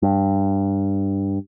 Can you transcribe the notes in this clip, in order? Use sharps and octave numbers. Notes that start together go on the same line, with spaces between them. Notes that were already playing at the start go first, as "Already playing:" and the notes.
G2